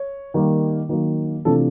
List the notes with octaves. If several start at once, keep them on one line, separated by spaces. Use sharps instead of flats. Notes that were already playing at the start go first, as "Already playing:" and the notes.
Already playing: C#5
D#3 G3 A#3
D#3 F#3 A#3
C3 E3 A3 D4 F4 A4